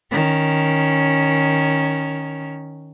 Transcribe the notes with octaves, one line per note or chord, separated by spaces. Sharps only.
D#3 C#4